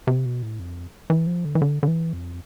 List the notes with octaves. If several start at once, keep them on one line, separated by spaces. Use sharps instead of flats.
C3
B2
A2
F2
E3
F3
D3
E3
D3
D3
E3
F2